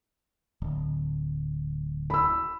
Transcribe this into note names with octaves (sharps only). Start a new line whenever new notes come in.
D1
B5 E6